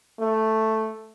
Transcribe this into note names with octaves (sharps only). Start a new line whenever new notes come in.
A3